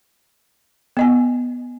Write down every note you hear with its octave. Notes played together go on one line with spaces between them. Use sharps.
B3 D#5 G#5